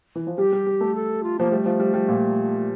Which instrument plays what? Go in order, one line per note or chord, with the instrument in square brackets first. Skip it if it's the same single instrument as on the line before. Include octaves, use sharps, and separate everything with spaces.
[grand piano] E3
F3
[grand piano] G3 [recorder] G4
[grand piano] G3
G3
A3
[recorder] A4
F4
[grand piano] F3 [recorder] A#3
[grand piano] G3 [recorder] A3
[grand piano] F3
G3
G3
A#2